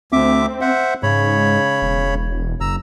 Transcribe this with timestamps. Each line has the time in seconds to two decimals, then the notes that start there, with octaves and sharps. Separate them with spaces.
0.13 D2 C4 E5 D6
0.61 C5 E5 F#5
1.03 G#2 C#3 C#5 B5
1.82 E1
2.61 F#1 A#5 E6